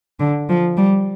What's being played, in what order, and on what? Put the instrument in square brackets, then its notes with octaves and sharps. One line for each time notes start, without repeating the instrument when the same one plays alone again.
[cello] D3
F3
G3